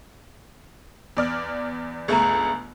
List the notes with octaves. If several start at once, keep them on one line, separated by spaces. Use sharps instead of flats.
E2 D5 F6
G1 C#2 A3 G#4 A#5